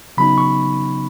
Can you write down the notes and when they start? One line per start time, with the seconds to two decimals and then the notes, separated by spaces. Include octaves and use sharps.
0.17 C#3 F#3 B3 D#4 B5
0.38 C#6